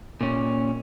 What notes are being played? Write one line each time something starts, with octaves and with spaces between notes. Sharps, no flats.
A#2 C#4